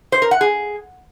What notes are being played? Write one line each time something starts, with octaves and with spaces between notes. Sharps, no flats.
C5
A#4
F#5
G#4